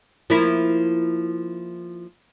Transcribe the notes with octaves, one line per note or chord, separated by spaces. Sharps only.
F3 A#3 E4